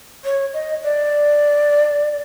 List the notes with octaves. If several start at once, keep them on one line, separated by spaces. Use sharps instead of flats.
C#5
D#5
D5